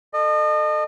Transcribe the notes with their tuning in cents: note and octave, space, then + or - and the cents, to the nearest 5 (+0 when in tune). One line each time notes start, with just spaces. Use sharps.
A4 +0 D#5 -35